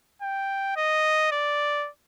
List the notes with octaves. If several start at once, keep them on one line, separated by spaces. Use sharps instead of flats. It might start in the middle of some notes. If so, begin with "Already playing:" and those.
G5
D#5
D5